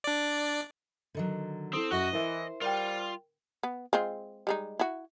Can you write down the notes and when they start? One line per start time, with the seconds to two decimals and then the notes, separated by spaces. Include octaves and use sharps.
0.04 D4 D5
1.15 D3 D#3 F#3
1.73 C4 E4 A4 D#6
1.91 F#2 F#4 D#5 F#5 C#6
2.13 E3 E4 A#4 C5 E5
2.61 G3 F4 A#4 G5
3.63 B3
3.93 G#3 C4 F4
4.47 G3 G#3 D#4
4.79 E4 F#4